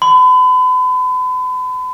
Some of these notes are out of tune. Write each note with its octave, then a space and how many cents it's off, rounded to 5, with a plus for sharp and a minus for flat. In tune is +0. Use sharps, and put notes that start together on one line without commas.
B5 +40